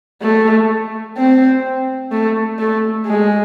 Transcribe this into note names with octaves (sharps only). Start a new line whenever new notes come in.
A3
C4
A3
A3
G#3